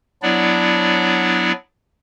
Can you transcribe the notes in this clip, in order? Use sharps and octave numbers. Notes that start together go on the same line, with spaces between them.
F#3 B3 D4 E4 D5